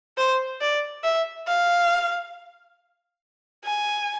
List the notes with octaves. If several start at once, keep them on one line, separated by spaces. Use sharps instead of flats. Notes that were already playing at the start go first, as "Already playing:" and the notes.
C5
D5
E5
F5
G#5